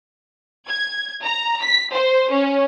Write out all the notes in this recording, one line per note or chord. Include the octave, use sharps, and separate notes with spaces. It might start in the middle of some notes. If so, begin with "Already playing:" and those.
G#6
A#5
B6
C5
C#4